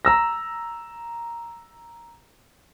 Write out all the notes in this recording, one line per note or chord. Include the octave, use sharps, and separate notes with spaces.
A#5 E6 A#6